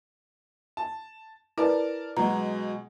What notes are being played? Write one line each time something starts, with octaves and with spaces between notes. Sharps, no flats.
A5
E4 A#4 B4 D5 A5
B2 F#3 G#3 A#5